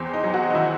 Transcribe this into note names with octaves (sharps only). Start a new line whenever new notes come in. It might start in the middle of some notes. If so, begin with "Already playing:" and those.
Already playing: E2 C4
D#4
F#3
F#4
D#4
D#3 E4